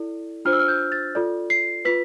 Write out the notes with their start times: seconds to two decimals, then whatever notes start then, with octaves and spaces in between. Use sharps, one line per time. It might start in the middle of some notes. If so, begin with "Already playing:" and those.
Already playing: E4 A4 D5
0.45 D4 F4 C5 F6
0.53 E6
0.59 F6
0.68 G6
0.92 A6
1.15 F4 A4 D5
1.50 C7
1.85 F4 B4 B6